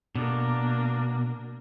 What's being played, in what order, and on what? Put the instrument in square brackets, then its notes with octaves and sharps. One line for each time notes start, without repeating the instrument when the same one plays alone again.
[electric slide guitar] B2 [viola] A#3 D4